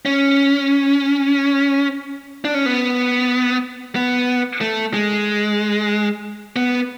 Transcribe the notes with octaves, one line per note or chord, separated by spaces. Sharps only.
C#4
D4
C#4
B3
B3
A3
G#3
B3